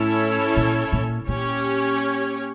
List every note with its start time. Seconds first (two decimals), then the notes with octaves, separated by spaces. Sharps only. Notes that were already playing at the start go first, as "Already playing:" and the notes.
Already playing: A2 C#4 E4 A4 C#5
0.57 A#2
0.92 A#2
1.27 A#2 C#4 G4 C#5